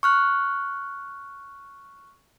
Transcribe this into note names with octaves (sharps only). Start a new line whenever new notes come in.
C#6 F6 F#6